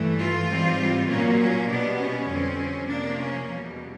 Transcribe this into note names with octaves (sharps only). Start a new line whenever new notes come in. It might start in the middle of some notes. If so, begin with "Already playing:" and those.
Already playing: G2 E3 A3
F4
G#2 E3 G3 C4
A#2 F#3 A#3 C#4
C#4
B2 G3 B3 D4
C#4
F2 D3 G3 C4
C3 F3 A#3 D4
C#4
E2 B2 G3